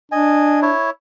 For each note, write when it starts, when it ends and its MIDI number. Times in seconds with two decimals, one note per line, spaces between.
0.12 0.72 62
0.12 0.60 75
0.12 0.60 80
0.62 0.90 64
0.62 0.90 73